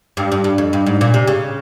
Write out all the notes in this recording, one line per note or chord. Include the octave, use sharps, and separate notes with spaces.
G2
G2
G2
F2
G2
G#2
A#2
C3
C#3